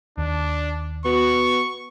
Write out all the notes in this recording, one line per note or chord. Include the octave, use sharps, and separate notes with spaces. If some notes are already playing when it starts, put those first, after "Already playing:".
D#2 D4
B3 F#4 C#6